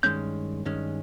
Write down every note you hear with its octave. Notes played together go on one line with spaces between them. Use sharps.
G2 D#3 G#3 C#4 G6
G2 D#3 G#3 C#4